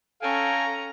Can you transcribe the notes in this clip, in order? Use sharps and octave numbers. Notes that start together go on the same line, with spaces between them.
C#4 A4 F5 G5 G#5 A#5